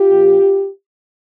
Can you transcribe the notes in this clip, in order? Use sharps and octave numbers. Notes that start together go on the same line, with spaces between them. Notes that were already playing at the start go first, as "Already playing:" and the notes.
Already playing: F4 G4
A#2 F3